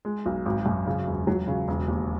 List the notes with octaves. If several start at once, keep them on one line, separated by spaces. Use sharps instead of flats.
G#3
B1
G#1
F#2
C#3
E1
F#3
C#3
E1
D#2